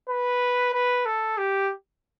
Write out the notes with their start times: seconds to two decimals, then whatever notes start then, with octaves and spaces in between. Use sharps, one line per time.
0.09 B4
0.73 B4
1.06 A4
1.38 G4